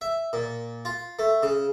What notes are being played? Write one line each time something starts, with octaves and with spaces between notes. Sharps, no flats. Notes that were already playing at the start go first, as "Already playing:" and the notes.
E5
A#2
F4
A3
C#3